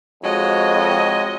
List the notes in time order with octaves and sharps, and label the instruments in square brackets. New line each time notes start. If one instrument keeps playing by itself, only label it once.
[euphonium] F2 [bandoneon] G#3 F#4 C#5 [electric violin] D#5